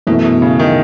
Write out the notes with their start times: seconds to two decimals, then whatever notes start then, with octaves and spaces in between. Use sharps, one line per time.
0.07 F#2 B2 E3 A3
0.25 B2
0.42 C#3
0.59 D#3